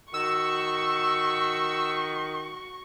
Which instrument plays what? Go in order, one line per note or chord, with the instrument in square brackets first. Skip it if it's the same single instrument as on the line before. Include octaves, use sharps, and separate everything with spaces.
[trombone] D#3 [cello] F#4 [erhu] C#6 [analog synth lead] E6